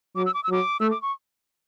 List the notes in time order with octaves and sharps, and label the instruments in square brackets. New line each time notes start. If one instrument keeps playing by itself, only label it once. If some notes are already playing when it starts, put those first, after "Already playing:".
[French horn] F#3 [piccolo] D6
[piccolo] E6
D6
E6
[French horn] F#3 [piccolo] D6
[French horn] A3 [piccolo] E6
[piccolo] D6
C#6